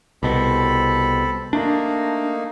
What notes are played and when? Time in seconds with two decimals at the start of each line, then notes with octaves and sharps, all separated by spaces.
0.23 C2 B2 C4 A4 B5
1.53 A3 A#3 D4 D#4